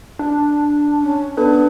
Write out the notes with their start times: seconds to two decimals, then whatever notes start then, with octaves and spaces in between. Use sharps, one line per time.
0.19 D4
1.02 C#4
1.37 B3 D4 A4 B4